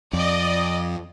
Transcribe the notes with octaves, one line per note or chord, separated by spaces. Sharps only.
F2 D5 D#5